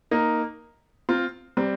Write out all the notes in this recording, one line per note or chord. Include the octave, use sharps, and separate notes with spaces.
A#3 D#4
C4 F4
G3 C4